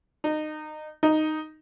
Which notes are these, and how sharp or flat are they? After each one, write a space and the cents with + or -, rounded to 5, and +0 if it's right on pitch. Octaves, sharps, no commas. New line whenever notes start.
D#4 -25
D#4 -5